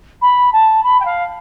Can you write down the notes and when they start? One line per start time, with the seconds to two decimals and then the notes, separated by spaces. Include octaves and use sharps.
0.21 B5
0.52 A5
0.83 B5
1.00 G5
1.05 F5